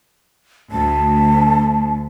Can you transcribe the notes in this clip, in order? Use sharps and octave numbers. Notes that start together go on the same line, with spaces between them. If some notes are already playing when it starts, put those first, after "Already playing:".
D2 A5